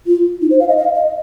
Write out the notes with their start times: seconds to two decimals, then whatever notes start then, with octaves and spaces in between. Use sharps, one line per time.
0.06 F4
0.42 D#4
0.51 C5
0.60 F5
0.68 D#5
0.78 F5
0.95 D#5